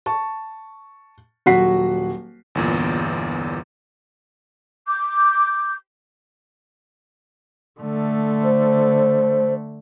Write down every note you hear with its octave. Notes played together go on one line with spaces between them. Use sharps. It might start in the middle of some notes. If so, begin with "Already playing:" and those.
A5 C#6
D#1 F#3 F#4 F#5 B6 C7
G1 E2 A#2
D6 G6
D3 A3
C5